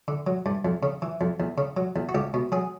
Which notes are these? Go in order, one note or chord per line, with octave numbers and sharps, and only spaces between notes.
D3
F#3
G2
F2
C#3
E3
F2
E2
C#3
F#3
E2
F#4
C#2 G4
B2
F#3 G#4